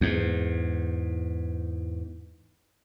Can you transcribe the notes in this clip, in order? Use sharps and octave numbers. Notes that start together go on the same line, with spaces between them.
E2 G#2